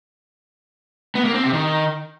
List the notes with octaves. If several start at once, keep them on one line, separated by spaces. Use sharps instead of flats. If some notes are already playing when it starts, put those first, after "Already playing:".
B3
A#3
C4
C3
D#3